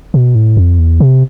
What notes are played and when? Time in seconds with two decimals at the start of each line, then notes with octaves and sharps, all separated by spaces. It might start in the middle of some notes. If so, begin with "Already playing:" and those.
0.14 B2
0.35 A2
0.57 F2
0.79 E2
1.00 C3